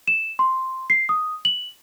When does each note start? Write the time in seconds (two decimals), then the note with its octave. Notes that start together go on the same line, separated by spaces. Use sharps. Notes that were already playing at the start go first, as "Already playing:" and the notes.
0.08 E7
0.39 C6
0.90 C7
1.09 D#6
1.45 F#7